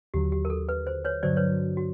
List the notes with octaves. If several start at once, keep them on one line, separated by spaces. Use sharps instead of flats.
D#2 D3 F#3 G4
G4
A#4
A4
B4
C5
B4 C#5
G2 D3 F#3 C5 D5
B4 C#5
F#4